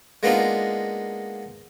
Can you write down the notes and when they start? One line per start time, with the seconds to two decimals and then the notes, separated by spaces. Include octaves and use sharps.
0.23 G#3 A#3 B3 D4 D#4 F4